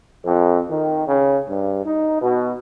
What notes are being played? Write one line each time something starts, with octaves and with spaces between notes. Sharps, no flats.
F2
D#3
C#3
G2
D#4
B2